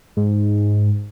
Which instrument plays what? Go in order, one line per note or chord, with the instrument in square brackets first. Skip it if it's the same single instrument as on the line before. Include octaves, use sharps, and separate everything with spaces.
[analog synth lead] G#2